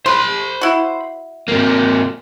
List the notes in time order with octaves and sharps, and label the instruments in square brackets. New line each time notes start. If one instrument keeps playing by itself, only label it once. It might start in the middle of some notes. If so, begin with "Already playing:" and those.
[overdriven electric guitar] C5 B5 [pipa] C6
[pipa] E4 F#4
[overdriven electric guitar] C3 A#3